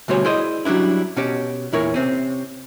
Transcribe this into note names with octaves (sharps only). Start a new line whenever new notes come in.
D2 B2 G3 C5 C#5 G#5
E4 G#4 C5 D5 D#5
F#3 G3 C#4 D4 E4
B2 C#4 F#4 G4
E2 A#2 E4 A#4 C#5
C3 C4 C#4